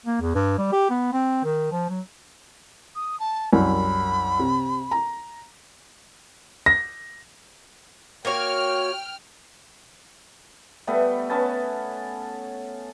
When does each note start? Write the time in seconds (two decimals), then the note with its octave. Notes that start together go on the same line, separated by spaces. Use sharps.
0.06 A#3
0.21 E2
0.35 G2
0.58 G3
0.72 G4
0.90 B3
1.13 C4
1.44 D#3
1.72 F3
1.90 F#3
2.95 D#6
3.20 A5
3.53 C2 F#2 B5
4.39 C3
4.91 A#5
6.66 A#6
8.25 A#3 F#4 C#5 G5 F6
10.87 G3 A3 B3
11.30 B3 C#4 A5